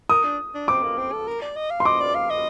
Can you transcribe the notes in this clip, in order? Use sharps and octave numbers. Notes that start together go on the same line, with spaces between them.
A#4 D#6
D4
D4
C4 D6
A#3
C4
A4
A#4
D5
D#5
F5
C6
D#5 D6
D5
F5
D#5